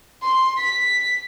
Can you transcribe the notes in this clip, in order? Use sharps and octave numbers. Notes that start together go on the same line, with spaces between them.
C6
B6